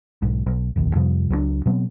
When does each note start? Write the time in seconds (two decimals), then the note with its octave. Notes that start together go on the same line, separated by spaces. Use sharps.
0.22 B1 G#2
0.46 B1
0.76 F1 A#1 D#2
0.95 F2 C3 F3 G3
1.30 C#2 F#3 G#3 D4
1.66 B2 F#3 B3 C4